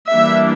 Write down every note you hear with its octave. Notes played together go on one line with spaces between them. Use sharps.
E3 G3 A#3 D4 E5